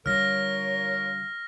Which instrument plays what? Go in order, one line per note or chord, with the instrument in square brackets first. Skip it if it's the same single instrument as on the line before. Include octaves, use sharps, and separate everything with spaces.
[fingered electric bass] D3 G3 [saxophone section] F4 A#4 [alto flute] C#5 [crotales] F6 A#6